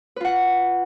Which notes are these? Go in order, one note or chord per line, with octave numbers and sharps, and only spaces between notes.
F4 B4 F#5